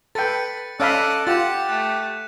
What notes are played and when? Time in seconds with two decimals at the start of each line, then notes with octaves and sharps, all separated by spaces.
0.15 A4 B4 G5 A6 C#7
0.80 C#4 A4 D5 D#5 F5 B5 F#6
1.27 F4 G4 F#5 A6 D#7 E7
1.69 A3 F#6